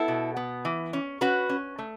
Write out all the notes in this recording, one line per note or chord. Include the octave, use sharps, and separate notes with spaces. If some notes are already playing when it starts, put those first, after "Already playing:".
Already playing: B3 E4 A4
B2
B3
E3
C#4
C#4 F#4 B4
C#4
A3